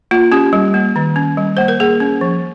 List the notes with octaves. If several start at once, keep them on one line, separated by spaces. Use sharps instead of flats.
A#3 F4
C#4 G4
G3
A#3
D#3
C#4
G3
A#3 C5
A#4
A#3 G#4
C#4
F3